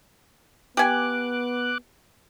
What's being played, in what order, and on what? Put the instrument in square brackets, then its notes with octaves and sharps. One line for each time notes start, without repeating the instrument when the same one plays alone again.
[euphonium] B3 [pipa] G4 G#5 [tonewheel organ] D6 F#6